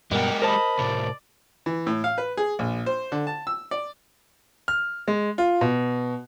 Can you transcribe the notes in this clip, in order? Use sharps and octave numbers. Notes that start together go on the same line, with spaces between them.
G2 B2 G#3 G4 A#4 F#5
A#4 C5 D#5 A5 B5
A2 C3 D5
E3
A2
F5
B4
G#4
A#1
C5
D3
A5
E6
D5
F6
G#3
F4
B2